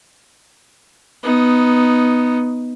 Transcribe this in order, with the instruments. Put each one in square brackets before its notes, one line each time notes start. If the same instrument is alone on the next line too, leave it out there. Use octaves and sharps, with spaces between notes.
[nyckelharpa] B3 D#4